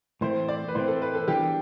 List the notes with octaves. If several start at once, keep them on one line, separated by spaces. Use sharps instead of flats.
A2 E3 A3 C4 C5
D5
B4
A2 E3 A3 C4 C5
A4
B4
A4
E3 G3 B3 D4 G4